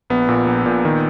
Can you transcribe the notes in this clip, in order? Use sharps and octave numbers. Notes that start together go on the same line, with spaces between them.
A#1 B3
A#2
A#1
A#2
D#3